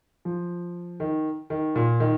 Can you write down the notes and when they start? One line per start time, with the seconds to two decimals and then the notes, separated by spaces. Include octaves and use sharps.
0.25 F3
1.00 D#3
1.50 D#3
1.76 A#2
2.00 D#3